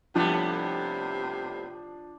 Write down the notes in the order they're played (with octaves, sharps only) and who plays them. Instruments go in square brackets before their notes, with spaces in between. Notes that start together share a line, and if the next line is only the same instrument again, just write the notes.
[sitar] A2 G3 B3 [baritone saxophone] C3 [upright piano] F3 [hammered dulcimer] D4